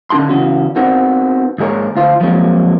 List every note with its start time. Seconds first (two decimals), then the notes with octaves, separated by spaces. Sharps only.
0.10 D3 C#4 D#4 F#4 A5 C6
0.29 C#3 E3 C#4 F#4
0.76 B3 C4 D#4 F#4 A#4 C5
1.58 D#2 G#2 G#4 A#4 C#5
1.96 D2 F4 C5
2.21 F3 F#3 G#3 A#3 C4 C#5